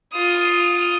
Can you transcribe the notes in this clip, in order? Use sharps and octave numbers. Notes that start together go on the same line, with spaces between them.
F4 D#6